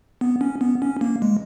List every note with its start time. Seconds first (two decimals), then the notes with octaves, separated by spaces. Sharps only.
0.21 B3
0.41 C#4
0.61 B3
0.82 C#4
1.01 A#3
1.22 G#3